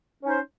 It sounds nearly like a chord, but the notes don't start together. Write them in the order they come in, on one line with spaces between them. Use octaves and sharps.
C#4 D#4 C5